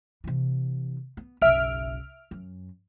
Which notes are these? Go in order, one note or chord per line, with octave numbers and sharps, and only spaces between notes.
C3 E3
B3
F#1 B1 E5 F6 D7
F#2